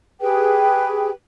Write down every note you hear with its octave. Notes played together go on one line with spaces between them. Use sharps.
G4 G#4 B4 G5